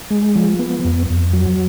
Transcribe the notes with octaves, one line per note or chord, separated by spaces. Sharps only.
G#3
F3
B3
F2
F2
F#3